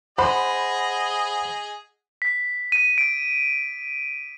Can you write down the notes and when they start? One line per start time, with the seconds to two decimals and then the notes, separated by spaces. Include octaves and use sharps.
0.18 G#4 C5 D#5 F#5 B5
2.22 B6
2.72 D#7
2.98 D7